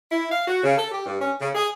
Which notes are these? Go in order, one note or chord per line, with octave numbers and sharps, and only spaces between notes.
E4
F5
F#4
C#3
A4
G4
G2
C#4
C#3
G#4